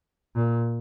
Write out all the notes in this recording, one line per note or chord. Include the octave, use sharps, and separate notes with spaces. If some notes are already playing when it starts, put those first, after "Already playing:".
A#2